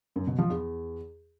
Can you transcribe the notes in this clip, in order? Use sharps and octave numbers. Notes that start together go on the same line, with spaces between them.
F#2
B2
F3
E2